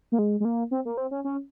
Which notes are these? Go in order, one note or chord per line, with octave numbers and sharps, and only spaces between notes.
A#3
G#3
G#3
A#3
C4
A#3
C4
C#4
C#4